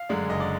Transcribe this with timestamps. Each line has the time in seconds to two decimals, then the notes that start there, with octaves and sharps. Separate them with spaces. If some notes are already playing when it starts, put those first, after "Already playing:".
Already playing: F5
0.09 F#2 D3 G#3 D4
0.30 F#1 D#5
0.40 D5